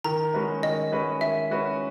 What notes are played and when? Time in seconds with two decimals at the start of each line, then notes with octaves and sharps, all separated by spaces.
0.04 D#3 A#5
0.34 G#3 C#4 F#4 B4
0.63 D#3 D#5
0.92 G#3 C#4 F#4 B4
1.21 D#3 E5
1.51 G#3 C#4 F#4 B4